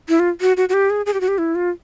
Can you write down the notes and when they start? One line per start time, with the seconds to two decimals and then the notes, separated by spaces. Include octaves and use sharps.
0.09 E4
0.20 F4
0.41 F#4
0.57 F#4
0.69 F#4
0.74 G4
0.90 G#4
1.06 G#4
1.14 G4
1.21 F#4
1.28 G4
1.38 E4
1.55 F4